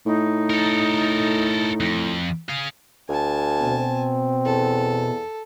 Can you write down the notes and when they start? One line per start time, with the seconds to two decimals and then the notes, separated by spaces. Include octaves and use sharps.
0.06 A2 D#4
0.50 A4 A#4
1.80 F2
2.49 G#4 F5
3.09 D2 G#5 A5
3.60 B2 C4
4.45 E2 A4